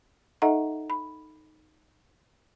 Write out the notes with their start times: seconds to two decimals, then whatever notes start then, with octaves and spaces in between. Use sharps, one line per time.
0.42 D#4 A4 D#5 E5 F#5 A#5
0.90 B5